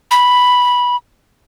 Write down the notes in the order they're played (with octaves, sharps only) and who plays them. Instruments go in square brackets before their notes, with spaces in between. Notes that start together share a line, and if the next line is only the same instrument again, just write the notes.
[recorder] B5